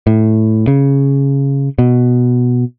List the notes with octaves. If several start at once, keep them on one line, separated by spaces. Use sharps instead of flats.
A2
C#3
B2